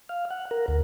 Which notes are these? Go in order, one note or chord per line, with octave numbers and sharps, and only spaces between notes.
F5
F#5
A#4
D2